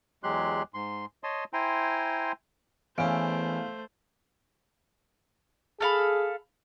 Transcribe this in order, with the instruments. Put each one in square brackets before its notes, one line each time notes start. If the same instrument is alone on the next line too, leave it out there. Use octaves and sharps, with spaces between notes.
[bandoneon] E2 F#3 G#3 G4 C6 F#6
G#2 C6
C#5 D#5 A5 C6 D#6
E4 C5 G5 G#5 A#5 C6
[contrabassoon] E2 [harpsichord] E3 C#4 [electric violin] A3 C5 [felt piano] F5 D7
[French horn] G#4 [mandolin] A4 F5 B5